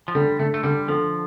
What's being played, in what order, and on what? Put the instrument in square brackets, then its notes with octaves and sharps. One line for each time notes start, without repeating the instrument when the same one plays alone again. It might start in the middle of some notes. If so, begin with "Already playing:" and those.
[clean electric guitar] F3
[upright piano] D3 [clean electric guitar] G3
[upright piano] D3 [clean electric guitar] A3
[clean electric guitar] A3
[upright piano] D3 [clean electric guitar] G3
[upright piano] D3 [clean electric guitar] F3